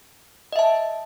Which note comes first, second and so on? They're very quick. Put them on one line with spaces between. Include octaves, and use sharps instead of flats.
D#5 E5 A5